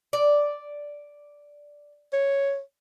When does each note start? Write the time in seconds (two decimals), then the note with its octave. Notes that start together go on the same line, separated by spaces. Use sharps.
0.13 D5
2.13 C#5